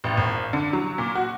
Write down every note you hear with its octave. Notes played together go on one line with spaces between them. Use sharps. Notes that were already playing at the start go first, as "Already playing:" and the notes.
A1
G#1
D3
F#3
A#2
F#4